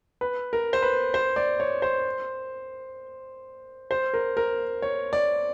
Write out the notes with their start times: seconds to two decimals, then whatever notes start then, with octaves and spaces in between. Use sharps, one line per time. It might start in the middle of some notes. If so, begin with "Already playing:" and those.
0.21 B4
0.53 A#4
0.73 C5
0.82 B4
1.14 C5
1.36 D5
1.60 C#5
1.82 C5
3.91 C5
4.14 A#4
4.37 A#4
4.82 C#5
5.13 D5